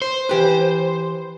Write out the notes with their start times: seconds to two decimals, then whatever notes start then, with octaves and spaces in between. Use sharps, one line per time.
0.02 C5
0.29 E3 G4 B4